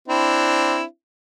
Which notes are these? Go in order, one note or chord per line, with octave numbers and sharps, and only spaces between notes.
C4 D4 E4